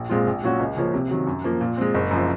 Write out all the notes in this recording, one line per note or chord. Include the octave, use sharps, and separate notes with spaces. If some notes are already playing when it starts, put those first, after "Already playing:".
Already playing: A#1
A#2 G#3 C4 F4
A#1
A#2 F#3 C#4 F#4
C#2
C#3 F3 A#3 C#4
C3
D#3 F#3
F#2
F3 A#3
A#2
G#3 C4
F#1
F#2 F3